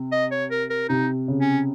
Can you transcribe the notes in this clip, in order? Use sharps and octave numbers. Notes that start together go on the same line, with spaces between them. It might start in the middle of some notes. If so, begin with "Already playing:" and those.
Already playing: C3
D#5
C#5
A#4
A#4
C3 D#4
C#3
C#4